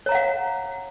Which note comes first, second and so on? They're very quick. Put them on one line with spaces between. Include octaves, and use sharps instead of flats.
C#5 A#5 F5 F#5